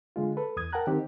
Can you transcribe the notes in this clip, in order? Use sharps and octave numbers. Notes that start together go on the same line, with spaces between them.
D3 G#3 F4
A4 B4
E2 D#6 G#6
A#4 F#5 G5 A5 A#5 F#6
D#3 C4 G4